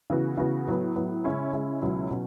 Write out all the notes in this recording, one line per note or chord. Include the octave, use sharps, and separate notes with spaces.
C#3 E3 B3 F#4
C#3 E3 B3 F#4
A2 F#3 B3
A2 F#3 B3
C#3 G#3 C#4 E4
C#3 G#3 C#4 E4
C#2 B2 F#3 C#4 E4
B2 F#3 C#4